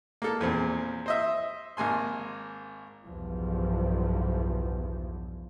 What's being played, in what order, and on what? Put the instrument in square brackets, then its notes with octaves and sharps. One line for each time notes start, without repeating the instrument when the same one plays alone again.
[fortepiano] A#3 A4
E2 A#2 C4
C5 D#5 E5
G#1 A#3 G#5 C6
[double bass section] B1 E2 G2 F3